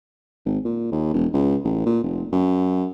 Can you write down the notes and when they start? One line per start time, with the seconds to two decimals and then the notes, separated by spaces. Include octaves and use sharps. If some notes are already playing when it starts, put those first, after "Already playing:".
0.46 G#1
0.65 A#2
0.92 D#2
1.14 E1
1.34 C#2
1.64 A1
1.86 A#2
2.03 F1
2.32 F#2